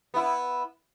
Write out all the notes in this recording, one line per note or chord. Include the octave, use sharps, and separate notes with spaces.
B3 E4